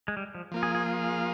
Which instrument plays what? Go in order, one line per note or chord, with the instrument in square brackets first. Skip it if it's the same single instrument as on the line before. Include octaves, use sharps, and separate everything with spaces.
[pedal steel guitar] G#3
G3
F3
[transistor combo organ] F3 A#3 F4
[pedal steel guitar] G#4
G#4
G#4